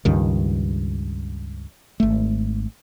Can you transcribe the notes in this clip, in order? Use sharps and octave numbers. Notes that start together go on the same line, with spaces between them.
C#2 G2 D#3
G#1 A3